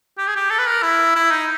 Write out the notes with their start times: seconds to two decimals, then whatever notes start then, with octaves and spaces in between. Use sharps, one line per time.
0.18 G4
0.27 G#4
0.36 G4
0.50 A4
0.58 B4
0.67 A#4
0.83 E4
1.15 E4
1.31 D#4